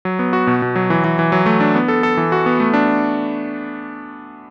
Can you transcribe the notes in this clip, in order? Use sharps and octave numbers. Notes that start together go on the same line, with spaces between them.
F#3
B3
F#4
B2
B2
F#3
E3
E3
E3
F#3
A3
D4
B3
A4
A4
E3
F#4
B3
A3
D4